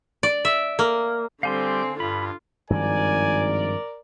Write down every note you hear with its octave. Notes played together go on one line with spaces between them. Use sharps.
D5
E5
A#3
D3 G3 C4 G4 F5 G#5 C6 G6
G2 F4 B5
G#1 G2 D#3 F3 A#4 D5 G#5